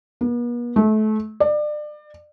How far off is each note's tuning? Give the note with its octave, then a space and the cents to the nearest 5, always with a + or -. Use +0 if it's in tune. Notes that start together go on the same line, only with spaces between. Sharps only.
B3 -45
A3 -30
D5 +30